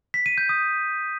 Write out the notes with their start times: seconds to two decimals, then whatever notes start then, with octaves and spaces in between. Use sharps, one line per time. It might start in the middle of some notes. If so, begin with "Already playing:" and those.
0.14 B6
0.26 D#7
0.38 G6
0.49 D#6